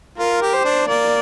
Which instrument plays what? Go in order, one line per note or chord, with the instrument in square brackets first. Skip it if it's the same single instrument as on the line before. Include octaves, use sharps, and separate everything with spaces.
[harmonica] F4 [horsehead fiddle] A#4
[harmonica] G4
[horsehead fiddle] C5
[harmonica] D4
[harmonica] A#3 [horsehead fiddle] D5